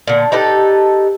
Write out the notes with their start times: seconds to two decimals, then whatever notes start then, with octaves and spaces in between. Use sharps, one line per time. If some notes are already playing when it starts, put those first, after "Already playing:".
0.07 A#2 D3
0.32 D#4 G4 A4 B4